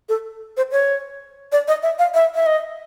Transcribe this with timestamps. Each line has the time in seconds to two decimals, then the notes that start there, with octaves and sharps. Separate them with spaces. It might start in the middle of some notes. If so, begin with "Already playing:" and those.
0.09 A4
0.57 C5
0.72 C#5
1.52 D5
1.68 D#5
1.83 E5
1.99 F5
2.14 E5
2.35 E5
2.46 D#5